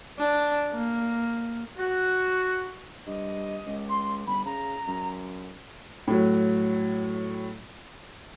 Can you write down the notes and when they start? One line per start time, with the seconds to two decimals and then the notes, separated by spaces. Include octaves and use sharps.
0.19 D4
0.73 A#3
1.77 F#4
3.06 G2 D#5
3.66 C#2
3.89 C6
4.27 G1 B5
4.45 C#3 A#5
4.87 F#2
6.07 A2 F#3